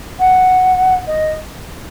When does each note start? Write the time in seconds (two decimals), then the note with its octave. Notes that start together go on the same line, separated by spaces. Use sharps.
0.20 F#5
1.07 D#5